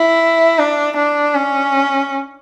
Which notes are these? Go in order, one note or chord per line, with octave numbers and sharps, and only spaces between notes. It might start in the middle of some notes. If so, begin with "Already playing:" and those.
Already playing: E4
D4
D4
C#4